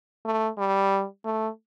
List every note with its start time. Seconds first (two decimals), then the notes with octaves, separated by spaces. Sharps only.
0.25 A3
0.58 G3
1.25 A3